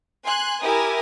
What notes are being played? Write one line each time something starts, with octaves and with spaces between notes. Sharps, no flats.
G#5 C6 F#6
E4 G4 A#4 G#5 D#6